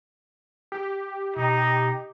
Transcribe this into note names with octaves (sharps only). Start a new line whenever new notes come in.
G4
B2 D#4